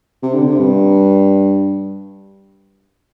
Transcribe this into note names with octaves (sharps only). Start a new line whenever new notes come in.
C3
D3
C3
G2